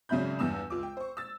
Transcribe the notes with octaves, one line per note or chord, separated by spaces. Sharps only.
G#1 C#3 F#3 E5 B5 G6
E2 G2 E6 E7
C#2 F4 D6
G5
C5 C#6
E6 A6